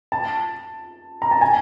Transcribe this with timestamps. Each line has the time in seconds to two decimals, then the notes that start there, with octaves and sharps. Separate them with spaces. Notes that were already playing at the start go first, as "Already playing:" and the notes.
0.12 A5
1.22 A#5
1.31 A5
1.41 G#5